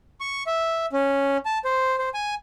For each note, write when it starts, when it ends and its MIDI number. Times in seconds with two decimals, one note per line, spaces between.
0.21 0.43 85
0.47 0.86 76
0.93 1.37 61
1.45 1.58 81
1.65 1.96 72
1.99 2.09 72
2.14 2.35 80